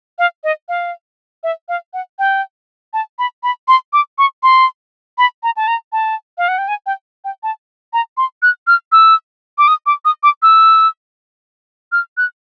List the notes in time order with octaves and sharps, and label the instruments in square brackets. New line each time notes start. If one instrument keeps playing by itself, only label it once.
[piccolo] F5
D#5
F5
E5
F5
F#5
G5
A5
B5
B5
C6
D6
C#6
C6
B5
A#5
A5
A#5
A5
F5
F#5
G5
G#5
G5
G5
A5
A#5
C6
F#6
F6
E6
D6
D#6
D6
D#6
D6
E6
F6
F#6